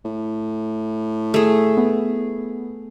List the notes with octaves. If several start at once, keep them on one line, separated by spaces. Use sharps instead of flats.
A2
A3 G#4
B3